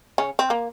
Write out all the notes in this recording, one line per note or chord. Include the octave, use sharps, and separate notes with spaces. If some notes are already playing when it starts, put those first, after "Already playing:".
C#3 C#4
C4
A#3